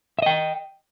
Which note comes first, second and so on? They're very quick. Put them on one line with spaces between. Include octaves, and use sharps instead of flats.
E5 D#5 G5